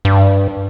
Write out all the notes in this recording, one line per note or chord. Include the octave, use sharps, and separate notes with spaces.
G2